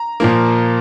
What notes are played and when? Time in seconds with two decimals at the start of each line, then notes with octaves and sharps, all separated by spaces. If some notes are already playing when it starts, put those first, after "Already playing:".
Already playing: A#5
0.20 A#2 F3 A#3